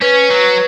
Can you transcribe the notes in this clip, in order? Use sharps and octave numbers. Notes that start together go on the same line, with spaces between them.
C#4 B4
F#3